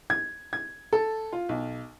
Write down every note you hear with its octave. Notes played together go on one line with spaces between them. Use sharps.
G#6
G#6
A4
F4
B1